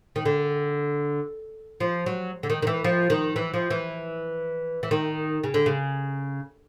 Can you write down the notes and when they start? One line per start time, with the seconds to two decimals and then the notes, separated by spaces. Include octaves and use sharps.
0.16 D#3
0.25 D3
1.80 F3
2.06 F#3
2.43 D3
2.50 D#3
2.62 D#3
2.67 E3
2.84 F3
3.10 D#3
3.36 E3
3.54 F3
3.70 E3
4.83 E3
4.91 D#3
5.44 C#3
5.54 D3
5.66 C#3